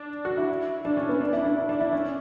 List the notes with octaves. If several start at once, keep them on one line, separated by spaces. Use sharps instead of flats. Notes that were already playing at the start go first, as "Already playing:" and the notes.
Already playing: D4
F#4
E4
D4
C#4
B3
D4
E4
D4
E4
D4
E4
C#4